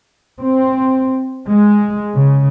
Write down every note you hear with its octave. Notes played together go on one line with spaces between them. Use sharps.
C4
G#3
C#3